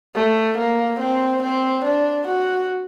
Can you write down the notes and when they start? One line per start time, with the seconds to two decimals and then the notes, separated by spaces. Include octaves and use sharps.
0.15 A3
0.58 A#3
1.00 C4
1.43 C4
1.85 D4
2.28 F#4